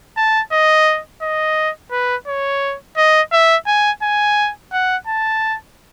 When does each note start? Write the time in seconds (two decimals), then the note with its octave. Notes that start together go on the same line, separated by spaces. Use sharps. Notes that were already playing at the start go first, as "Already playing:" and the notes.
0.17 A5
0.52 D#5
1.22 D#5
1.91 B4
2.27 C#5
2.97 D#5
3.32 E5
3.67 G#5
4.02 G#5
4.72 F#5
5.07 A5